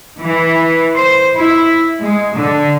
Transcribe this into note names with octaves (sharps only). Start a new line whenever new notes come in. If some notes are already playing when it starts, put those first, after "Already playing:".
E3
C5
E4
G#3
D3